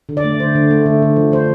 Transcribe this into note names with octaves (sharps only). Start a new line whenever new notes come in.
D3
D5
A3
D3 C5
D3
A3
D3
D3
F3
F3 C5